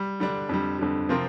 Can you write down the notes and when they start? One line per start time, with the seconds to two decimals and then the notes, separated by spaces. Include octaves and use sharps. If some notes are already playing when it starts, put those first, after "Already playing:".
Already playing: G3
0.20 D3 G3 D4
0.49 F2 D3 G3
0.79 F2 D3 G3
1.09 C3 F3 C4 F4 A#4